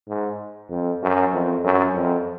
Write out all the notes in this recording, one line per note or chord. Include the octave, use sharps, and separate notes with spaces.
G#2
F2
F#2
F2
F#2
F2